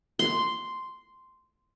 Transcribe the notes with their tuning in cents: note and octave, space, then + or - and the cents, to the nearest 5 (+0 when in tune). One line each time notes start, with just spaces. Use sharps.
C6 -5